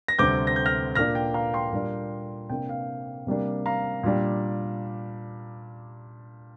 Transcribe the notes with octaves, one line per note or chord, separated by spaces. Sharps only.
A#6
D2 C3 G3 C4 D6 G6
A#6
G6
F6 A#6
A#2 A#3 D4 F6 A#6
G5
F5 A#5
G5 C6
A#2 G3 A#3 D4
C3 A#3 D4 G5
F5
C3 G3 A#3 D4
F5 A#5
A#2 G3 D4